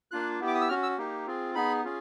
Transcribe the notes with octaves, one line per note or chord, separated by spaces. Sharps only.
A#3 D4 F4 F#6
B3 E4 G4
D6
D#6
E6
C#4 F#4 F6
E6
A#3 D#4 G4
C4 F4 G#4
B3 D#4 G#4 B5
C#4 F4 G#4